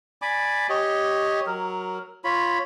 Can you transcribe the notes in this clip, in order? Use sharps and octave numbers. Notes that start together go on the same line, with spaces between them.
D5 G#5 B5 D6
G4 C#5 D#5
F#3 A#4
F4 C#5 B5